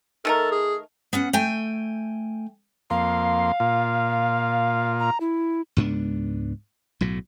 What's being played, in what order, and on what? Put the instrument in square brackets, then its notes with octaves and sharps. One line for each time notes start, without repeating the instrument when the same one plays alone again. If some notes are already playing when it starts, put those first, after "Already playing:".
[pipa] D#3 A3 A#4 [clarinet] A4
[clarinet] G#4
[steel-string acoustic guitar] B3 C#4 F#5
A3 G5 G#5
[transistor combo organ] F2 A#3 C6 [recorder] F5
[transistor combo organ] A#2 F4
[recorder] A#5
E4
[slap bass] C#2 G#2 B3 D4
B1 A2 F#3